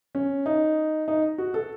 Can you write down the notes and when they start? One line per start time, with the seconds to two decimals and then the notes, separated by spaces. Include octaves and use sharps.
0.15 C#4
0.46 D#4
1.08 D#4
1.38 F#4
1.54 A4